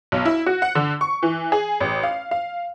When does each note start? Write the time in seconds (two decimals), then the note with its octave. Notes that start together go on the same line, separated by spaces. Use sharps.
0.12 B1
0.25 E4
0.46 F#4
0.62 F#5
0.75 D3
1.01 C#6
1.23 E3
1.52 G#4
1.80 A1
2.03 F5
2.31 F5